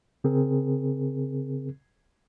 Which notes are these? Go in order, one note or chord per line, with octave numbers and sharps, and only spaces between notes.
C#3 C4 G#4 A#4